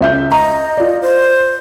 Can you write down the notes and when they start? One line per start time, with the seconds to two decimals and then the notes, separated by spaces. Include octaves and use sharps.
0.01 C#2 E5 G6
0.32 D#5 A#5
0.77 F4 D5
1.02 C5